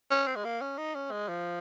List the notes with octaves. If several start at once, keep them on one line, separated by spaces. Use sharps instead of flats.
C#4
C4
G#3
A#3
C#4
D#4
C#4
G#3
F3